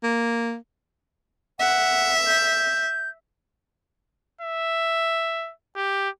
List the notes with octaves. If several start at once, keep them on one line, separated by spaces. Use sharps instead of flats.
A#3
E5 F#5
G6
E5
G4